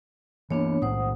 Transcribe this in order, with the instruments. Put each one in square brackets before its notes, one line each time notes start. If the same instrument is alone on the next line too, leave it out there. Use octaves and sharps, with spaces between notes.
[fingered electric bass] E3 A#3 [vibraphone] B3 D4 C#5
[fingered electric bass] B1 A2 [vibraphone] C5 F#5 D#6